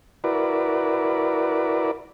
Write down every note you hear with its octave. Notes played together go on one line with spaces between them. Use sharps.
E4 F#4 A#4 B4 D5